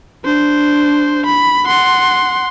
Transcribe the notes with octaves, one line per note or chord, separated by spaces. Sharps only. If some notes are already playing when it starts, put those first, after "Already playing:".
D4 C5
B5
F#5 C6